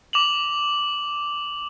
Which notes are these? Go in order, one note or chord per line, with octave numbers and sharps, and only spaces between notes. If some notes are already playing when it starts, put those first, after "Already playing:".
D6 F7 F#7